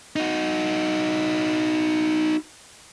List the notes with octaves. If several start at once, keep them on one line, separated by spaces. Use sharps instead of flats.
D#4 F#4